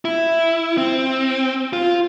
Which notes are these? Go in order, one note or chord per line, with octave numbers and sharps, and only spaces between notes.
E4
C4
F4